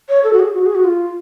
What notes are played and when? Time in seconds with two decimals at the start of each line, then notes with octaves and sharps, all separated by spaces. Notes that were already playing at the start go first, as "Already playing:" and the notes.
0.09 C#5
0.24 A4
0.33 F#4
0.40 G#4
0.54 F#4
0.66 G#4
0.75 F#4
0.84 F4